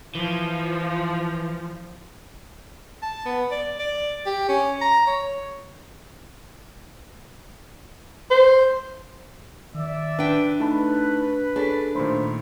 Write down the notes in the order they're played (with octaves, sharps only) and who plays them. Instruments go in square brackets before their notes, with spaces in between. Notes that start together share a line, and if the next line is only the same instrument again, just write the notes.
[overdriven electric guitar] E3 [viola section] F3
[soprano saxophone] A5
B3
D5
D5
G4
C#4
A#5
C#5
C5
[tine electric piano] D#3 [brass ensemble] D5 E5
[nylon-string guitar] D4 G5 [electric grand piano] B4
[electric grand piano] A3 [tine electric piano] D#4 A5 B5 [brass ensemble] B4
[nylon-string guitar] D4 [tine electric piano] G#4 A4 [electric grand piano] C#5 A5 B6
[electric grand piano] A#2 D#3 A3 [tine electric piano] C5 B5 C6